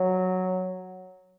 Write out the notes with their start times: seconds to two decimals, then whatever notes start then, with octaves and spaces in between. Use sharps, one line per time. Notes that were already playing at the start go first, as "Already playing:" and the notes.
Already playing: F#3